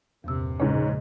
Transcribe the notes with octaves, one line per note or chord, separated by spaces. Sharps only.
A#1 E2 G2 C3 E6
A#1 G#2 C#3 C#4